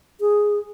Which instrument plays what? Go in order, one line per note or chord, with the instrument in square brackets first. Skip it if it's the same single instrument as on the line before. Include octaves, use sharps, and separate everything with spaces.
[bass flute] G#4